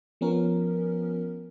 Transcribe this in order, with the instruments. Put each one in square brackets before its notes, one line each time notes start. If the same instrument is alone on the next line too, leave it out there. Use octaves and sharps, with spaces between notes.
[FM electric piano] F3 B3 C#4 A#4